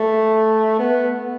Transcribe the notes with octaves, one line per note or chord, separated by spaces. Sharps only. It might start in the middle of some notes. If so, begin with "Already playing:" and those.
Already playing: A3
B3